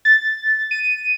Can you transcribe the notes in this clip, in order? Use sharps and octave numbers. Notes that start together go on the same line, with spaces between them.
A6
D#7